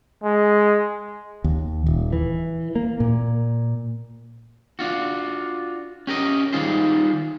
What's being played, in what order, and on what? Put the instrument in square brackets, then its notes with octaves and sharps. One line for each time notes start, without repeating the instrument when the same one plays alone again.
[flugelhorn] G#3
[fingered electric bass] D#2
D#1
E3
A#3
A#2
[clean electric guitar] D4 F4 F#4
C#4 G4 A#4 D#5
D#3 G3 D#4 F4 G#4 C5